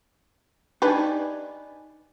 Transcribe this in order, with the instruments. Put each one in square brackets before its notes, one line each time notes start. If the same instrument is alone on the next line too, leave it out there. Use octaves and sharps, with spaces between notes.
[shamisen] D4 G4 B4 [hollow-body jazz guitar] D#4 D5 G#5